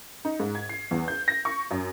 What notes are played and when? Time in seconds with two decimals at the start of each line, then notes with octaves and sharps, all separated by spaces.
0.25 D#4
0.40 G#2
0.55 G#6
0.69 C7
0.91 E2
1.08 G6
1.28 A#6
1.45 C#6
1.71 F#2